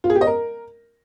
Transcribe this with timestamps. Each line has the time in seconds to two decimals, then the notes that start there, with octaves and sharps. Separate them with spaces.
0.04 F4
0.10 G#4
0.15 G4
0.21 D#5
0.27 A#4